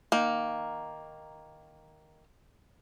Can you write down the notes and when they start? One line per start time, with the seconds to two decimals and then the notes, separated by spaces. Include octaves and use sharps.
0.12 D#3 A#3